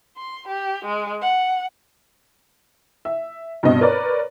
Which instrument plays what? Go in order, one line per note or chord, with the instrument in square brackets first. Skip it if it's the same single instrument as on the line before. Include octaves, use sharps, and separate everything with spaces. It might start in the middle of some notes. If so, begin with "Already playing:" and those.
[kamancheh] C6
G4
G#3
F#5
[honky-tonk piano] E5
G2 B2 C4 D#5
A#4 B4 C#5 D5